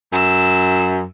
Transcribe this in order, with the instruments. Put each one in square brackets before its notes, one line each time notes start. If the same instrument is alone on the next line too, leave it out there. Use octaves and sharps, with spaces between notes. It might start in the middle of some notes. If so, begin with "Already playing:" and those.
[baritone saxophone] F#2 [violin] E6